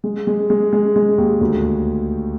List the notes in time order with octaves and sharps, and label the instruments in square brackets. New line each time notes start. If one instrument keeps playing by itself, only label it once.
[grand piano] G#3
G#3
G#3
G#3
G#3
D#2
D2